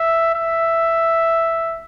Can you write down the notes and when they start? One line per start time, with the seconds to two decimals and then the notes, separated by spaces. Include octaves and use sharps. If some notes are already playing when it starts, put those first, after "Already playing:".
Already playing: E5
0.34 E5